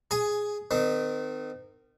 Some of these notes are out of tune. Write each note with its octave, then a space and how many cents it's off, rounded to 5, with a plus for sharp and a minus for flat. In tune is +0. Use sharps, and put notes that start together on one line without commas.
G#4 +0 G#5 +15
D#3 -25 C4 -45